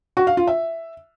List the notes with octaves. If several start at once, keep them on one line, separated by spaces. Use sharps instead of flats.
F#4
F5
F4
E5